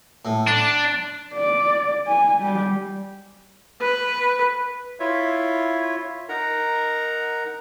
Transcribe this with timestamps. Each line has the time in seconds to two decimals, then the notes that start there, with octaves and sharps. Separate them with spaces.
0.25 A2
0.47 D4 C6
1.34 D5
2.07 G#5
2.41 G3
3.81 B4
5.00 E4 F4 C#5 E5
6.29 D#4 A#4 F#5 A#5